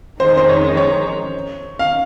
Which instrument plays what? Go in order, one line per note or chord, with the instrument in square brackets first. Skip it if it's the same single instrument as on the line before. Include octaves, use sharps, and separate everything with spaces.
[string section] F2 D#3 G#3 D#4 [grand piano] C5
[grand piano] C5
C#5
C#5
F5